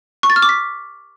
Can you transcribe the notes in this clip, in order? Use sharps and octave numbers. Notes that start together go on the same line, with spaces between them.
C#6
A6
F6
D6
B6